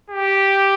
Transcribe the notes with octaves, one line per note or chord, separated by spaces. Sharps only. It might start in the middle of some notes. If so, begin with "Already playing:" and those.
G4